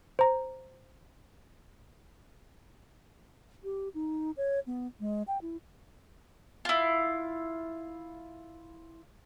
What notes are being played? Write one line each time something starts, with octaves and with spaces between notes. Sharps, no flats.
C5 A#5
G4
D#4
C#5
B3
G#3
G5
E4
E4 F4